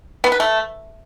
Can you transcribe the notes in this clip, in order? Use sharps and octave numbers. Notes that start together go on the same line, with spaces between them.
B3
B4
A3